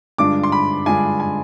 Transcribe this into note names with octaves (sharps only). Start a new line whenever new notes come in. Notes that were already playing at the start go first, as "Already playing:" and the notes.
G2 D3 G#3 D4 F4 D6
C6
B5
G2 D3 G#3 D4 F4 G#5
G#5